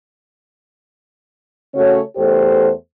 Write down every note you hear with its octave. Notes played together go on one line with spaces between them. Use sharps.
C#3 A3 C#4 F#4 C#5
E2 A3 G4 A4 C5